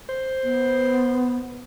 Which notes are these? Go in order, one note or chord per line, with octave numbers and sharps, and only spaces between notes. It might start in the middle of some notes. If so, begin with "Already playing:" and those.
C5
B3